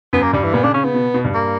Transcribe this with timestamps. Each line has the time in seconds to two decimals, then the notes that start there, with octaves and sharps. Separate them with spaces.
0.13 F#2 B3
0.23 A#3
0.33 G2 G3
0.43 E3
0.54 A#2 B3
0.64 C#3 D4
0.74 C#3 C#4
0.84 C#3 B3
0.94 B2
1.14 B2
1.24 G2
1.34 A#3